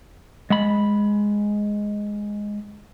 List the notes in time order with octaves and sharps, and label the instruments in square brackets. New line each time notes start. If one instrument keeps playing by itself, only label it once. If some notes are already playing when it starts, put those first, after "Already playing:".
[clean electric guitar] G#3 B5